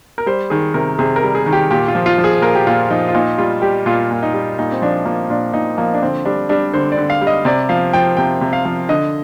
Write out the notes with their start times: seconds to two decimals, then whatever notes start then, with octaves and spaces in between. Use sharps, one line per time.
0.18 A#4
0.26 G3 C5
0.50 D#3 G#4
0.74 C3 A#4
0.99 C3 G#4
1.16 A#4
1.23 G3
1.35 G#4
1.46 D#3
1.52 G4
1.71 A#2 G4
1.88 F4
1.95 F3
2.06 F4
2.18 F3
2.24 G#4
2.42 A#2 A#4
2.55 G4
2.67 A#2 F4
2.90 F3 D#4
3.08 F4
3.15 A#2 D#4
3.38 G3 F4
3.62 G3 G4
3.86 A#2 F4
4.11 A#2
4.23 D#4
4.34 G3
4.59 A#2 D#4
4.72 C4
4.82 F3 D4
5.05 F3 A#3
5.30 A#2 D4
5.53 A#2 D#4
5.78 F3 A#3
5.94 D4
6.02 D3 C4
6.25 G3 D4
6.49 G3 D4
6.73 D3 C5
6.92 D5
6.97 D3
7.10 F5
7.21 G3
7.27 D#5
7.45 C3 D5
7.69 F3 F5
7.93 F3 G5
8.17 C3 G5
8.41 C3
8.53 F5
8.65 F3
8.89 D3 D#5